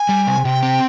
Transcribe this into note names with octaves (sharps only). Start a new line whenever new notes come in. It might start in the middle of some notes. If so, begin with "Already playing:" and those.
Already playing: G#5
G3
C3
C3 G5
C4